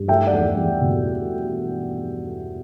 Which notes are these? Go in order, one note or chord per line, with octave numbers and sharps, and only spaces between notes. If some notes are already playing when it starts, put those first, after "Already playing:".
Already playing: G2
A3 E5 G5
D5 F#5
E2
E2
B2
A3